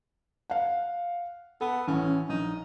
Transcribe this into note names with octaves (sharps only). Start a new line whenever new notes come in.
F5 F#5
B3 A4
A1 C#4
A#1 D#4